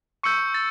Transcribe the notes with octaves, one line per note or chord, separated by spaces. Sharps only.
C#6 E6 G6 C#7
A6